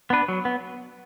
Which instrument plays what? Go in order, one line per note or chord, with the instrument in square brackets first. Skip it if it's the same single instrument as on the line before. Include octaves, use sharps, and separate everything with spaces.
[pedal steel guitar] B3 D4 B4
F#3
B3